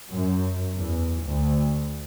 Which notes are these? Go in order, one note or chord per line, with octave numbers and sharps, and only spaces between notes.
F#2
E2
D2